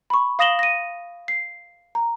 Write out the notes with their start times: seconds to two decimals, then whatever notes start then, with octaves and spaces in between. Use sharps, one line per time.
0.10 B5 C#6
0.39 F5 D#6 A#6 E7 F#7 G7
0.59 A#6 D#7
1.28 C7
1.95 A#5